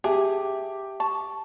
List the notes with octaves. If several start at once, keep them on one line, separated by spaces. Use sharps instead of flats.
G4 G#4 E5 G5 A5
A5 C#6